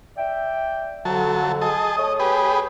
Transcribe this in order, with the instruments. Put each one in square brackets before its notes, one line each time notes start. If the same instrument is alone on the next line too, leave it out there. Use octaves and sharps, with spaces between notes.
[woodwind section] D5 E5 G5
[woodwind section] F2 D3 [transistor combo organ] F#3 A5
[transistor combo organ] G#4 D#5 A5
[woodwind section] A3 C#5 D#6 [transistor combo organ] D#5
[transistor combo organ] G4 G#4 B4